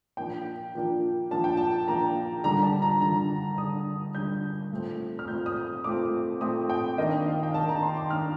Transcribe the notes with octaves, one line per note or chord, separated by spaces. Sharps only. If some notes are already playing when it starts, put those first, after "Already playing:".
A#2 F3 A#3 D4 G5
A#2 F3 A#3 D4
A#2 F3 A#3 D4 A5
G5
A5
A#2 F3 A#3 D4 A#5
D3 G3 D4 A#5
A5
A#5
D3 G3 D4 A#5
D3 G3 D4 D#6
D3 G3 D4 G6
A#2 A3 C4
F6
A#2 A3 C4 G6
D#6
A#2 A3 C4 D6
A#2 A3 C4 D#6
G5
D#3 A#3 D4 D#5
F5
G5
D#3 A#3 D4 A5
A#5
C6
D6
D#3 A#3 D4 F6